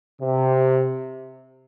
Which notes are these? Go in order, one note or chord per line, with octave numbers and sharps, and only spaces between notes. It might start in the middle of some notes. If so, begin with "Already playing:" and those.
C3